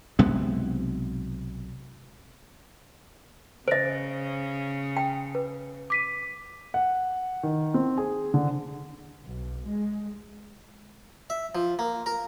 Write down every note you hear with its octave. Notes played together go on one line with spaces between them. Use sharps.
B1 C3 G#3 B3
C#3 C5 D#5 A#6 D7
G5
B4
D6 B6 D#7
F#5
D#3
C4
G#4
D3
B1
G#3
E5
F3
A#3
A#4